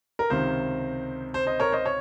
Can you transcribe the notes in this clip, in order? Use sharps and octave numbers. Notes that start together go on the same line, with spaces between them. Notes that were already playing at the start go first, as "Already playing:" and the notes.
A#4
C#2 C3 D#3 C5
C5
C5 D#5
A#4 C#5
C5 D#5
C#5